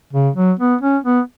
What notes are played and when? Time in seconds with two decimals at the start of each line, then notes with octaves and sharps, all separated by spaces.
0.13 C#3
0.36 F#3
0.60 B3
0.82 C#4
1.04 B3